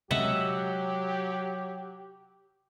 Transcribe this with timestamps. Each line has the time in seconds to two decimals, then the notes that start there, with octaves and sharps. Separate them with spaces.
0.11 C3 F#3 G#3 C#4 G4 D#5 E5 F#5